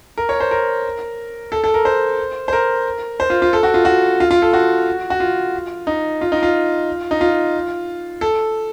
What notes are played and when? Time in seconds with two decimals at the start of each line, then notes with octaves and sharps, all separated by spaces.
0.18 A#4
0.29 C#5
0.40 C5
0.51 A#4
1.52 A4
1.64 A4
1.74 A#4
1.85 C5
2.48 C5
2.53 A#4
3.20 C5
3.30 F4
3.42 F4
3.53 A4
3.63 F#4
3.74 F4
3.85 F#4
4.20 F4
4.31 F4
4.42 A4
4.53 F#4
5.10 F#4
5.20 F4
5.87 D#4
6.21 F4
6.32 D#4
6.43 F4
7.11 D#4
7.21 F4
8.21 A4